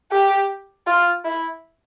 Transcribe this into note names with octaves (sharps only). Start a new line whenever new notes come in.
G4
F4
E4